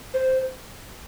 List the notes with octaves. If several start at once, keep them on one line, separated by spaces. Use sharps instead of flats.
C5